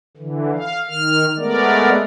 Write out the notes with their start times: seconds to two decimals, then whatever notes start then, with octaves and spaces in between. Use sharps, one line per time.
0.17 D3 E3
0.54 F5
0.88 D#3 F6
1.38 G#3 A3 B3 A#4 D5